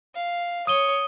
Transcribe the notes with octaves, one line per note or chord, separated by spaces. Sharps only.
F5
C#5 D#6 D#7 G7